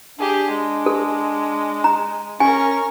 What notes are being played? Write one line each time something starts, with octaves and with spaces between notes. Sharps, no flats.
D4 G4 G#4
G#3
A4
A#5
C#4 A#4 G#5 C#6